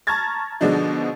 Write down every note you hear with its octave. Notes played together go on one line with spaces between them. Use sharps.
A5 A#5 C#6 F6 G#6 A6
B2 D3 F3 G#3 D4 D#4